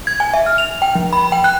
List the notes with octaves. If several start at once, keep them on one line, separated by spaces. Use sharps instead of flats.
G#6
G#5
E5
F6
F7
G5
F3
B5
G5
F#6